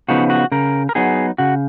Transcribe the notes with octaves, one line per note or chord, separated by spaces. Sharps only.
C#3 F3 B3 D#4 F#4
F#4
C#3 A#4
A#4
F#3 B3 D#4 G#4
C#3 F#4